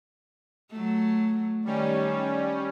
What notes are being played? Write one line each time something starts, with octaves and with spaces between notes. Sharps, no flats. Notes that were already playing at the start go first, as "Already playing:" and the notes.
F#3 A3
D#3 G3 C#4